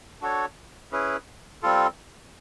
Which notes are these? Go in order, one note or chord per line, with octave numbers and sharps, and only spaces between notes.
D4 F#4 A4 C#5
C#4 E4 G#4 B4
G3 C4 F4 A4